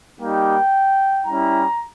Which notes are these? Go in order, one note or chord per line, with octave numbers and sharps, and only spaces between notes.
G3 A#3 D#4 G4 G5
G3 C#4 E4 A#5